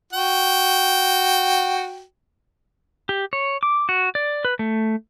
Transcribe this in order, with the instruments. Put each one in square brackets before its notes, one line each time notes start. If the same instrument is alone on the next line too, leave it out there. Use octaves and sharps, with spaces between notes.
[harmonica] F#4 G5
[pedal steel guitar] G4
C#5
D6
F#4
D5
B4
A3